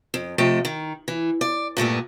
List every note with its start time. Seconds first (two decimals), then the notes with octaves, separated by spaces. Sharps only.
0.14 F2
0.38 C3 F3 A3 D#5 G5
0.65 D#3
1.08 E3
1.41 D5
1.77 G2 A#2 A3 B3